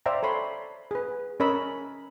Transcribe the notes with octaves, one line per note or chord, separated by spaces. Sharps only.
C5 D5 E5 F5 G5 A#5
A4 C#5 B5 C6
G#4 B4
C#4 A#4 C#5 D#5 B5 E6